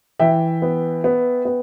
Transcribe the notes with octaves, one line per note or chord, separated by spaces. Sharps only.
E3 E5 G5
B3
B3
B3